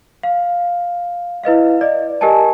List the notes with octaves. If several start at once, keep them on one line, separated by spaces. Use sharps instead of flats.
F5
E4 B4 D#5 F5
D5 D#5
G4 A#4 D#5 G#5 A5